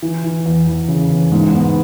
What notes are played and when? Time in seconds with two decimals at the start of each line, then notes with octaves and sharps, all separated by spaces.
0.02 E3
0.24 E3
0.46 E2
0.67 E2
0.88 C#3
1.10 E2
1.32 G#2
1.53 B3